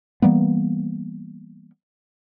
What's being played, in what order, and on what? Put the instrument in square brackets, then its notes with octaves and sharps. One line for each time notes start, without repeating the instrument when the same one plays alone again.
[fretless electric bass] E3 G3 A#3 B3